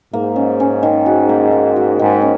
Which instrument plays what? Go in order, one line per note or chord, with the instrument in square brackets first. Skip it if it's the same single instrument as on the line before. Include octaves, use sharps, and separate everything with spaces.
[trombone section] G#2 [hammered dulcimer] A#3
[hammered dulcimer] C#4
C#4
D#3
F#4
A#3
A#3
F#4
[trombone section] G#2 [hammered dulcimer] D#3
[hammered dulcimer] C#4